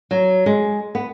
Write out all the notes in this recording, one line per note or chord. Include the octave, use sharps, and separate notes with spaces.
F#3
G#3
B3